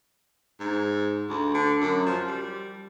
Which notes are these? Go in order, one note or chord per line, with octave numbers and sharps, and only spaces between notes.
G#2
D2
D3
F#2
F3
G3